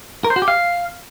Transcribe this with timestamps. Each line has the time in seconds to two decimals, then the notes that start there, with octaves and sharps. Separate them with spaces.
0.24 A#4
0.30 C5
0.36 F#4
0.42 G4
0.48 F5